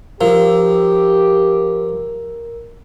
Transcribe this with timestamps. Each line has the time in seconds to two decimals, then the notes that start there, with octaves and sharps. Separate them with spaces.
0.21 F3 G4 A#4